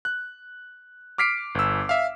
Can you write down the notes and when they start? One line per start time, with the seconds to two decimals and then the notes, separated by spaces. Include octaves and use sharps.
0.05 F#6
1.18 D6 F6 B6 C7 D7
1.55 G1 E6
1.89 E5 F5